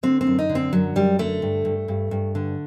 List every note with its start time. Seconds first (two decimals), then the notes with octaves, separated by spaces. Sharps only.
0.03 D3 C4
0.21 C4
0.27 F#2
0.39 D#4
0.49 D3
0.55 C4
0.73 F#2 F#3
0.96 F#2 G3
1.19 D3 A3
1.42 G2
1.65 G2
1.88 G2
2.11 G2
2.35 D3